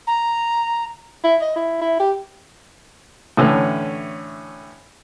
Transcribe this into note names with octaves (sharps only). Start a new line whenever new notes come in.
A#5
E4
D#5
E4
E4
G4
A2 D3 E3 C#4